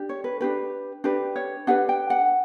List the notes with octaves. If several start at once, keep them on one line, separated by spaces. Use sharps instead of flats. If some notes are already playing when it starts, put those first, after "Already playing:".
Already playing: D4 G4
C#5
B4
D4 G4 B4
D4 G4 B4
C#5
D4 G4 B4 F#5
G5
F#5